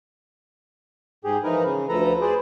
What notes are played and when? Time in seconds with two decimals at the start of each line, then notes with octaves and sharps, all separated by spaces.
1.24 G#2 G4 G#4
1.44 E3 F3 D#4 A#4 B4
1.64 C#3
1.89 D2 F3 A4 B4 A#5
2.21 G#4 B4 C5 D5